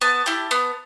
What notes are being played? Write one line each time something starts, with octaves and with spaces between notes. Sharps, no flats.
B3 A5
E4 G4
B3